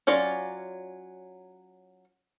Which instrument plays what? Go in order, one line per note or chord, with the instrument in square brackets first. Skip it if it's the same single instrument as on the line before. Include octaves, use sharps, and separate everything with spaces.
[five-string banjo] F#3 C#4 F4 D5